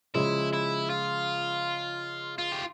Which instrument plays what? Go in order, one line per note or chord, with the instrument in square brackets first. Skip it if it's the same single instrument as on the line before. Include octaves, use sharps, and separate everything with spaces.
[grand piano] C#3 F3 G#3 [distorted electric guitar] E4
[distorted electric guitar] E4
F4
F4
G4